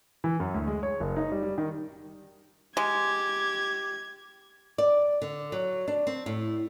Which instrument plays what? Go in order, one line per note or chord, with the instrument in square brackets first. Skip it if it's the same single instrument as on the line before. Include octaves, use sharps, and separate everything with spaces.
[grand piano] E3
F#2
D2
G#3
C#5
F#1
D#4
G3
G3
D#3
[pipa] G#3 [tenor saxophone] G4 [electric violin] G#6
[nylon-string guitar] D5
D3
F#3
D4
C4
A2